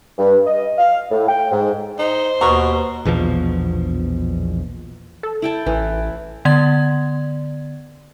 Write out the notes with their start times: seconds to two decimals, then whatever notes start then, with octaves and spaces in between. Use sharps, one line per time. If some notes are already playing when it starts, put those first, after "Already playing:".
0.18 G2
0.47 D#5
0.78 F5
1.11 A2
1.28 G5
1.52 G#2
1.99 D#4 C5
2.41 D#2 B2 A#5 C#6
3.05 A#1 E2 B2 F3
5.23 A4
5.42 E4 G5 A5
5.66 A1 E3
6.45 D3 B3 D5 G#6